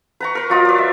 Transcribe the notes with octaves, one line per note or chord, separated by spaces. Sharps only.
B4 A#5 C#6
A#4 B4
F#3 F4 D#5
B4 D5
E5